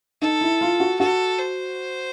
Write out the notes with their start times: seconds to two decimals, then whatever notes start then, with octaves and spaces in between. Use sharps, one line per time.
0.22 D#4 A4
0.41 E4
0.61 F4
0.80 F#4
1.00 F#4 A4
1.39 C5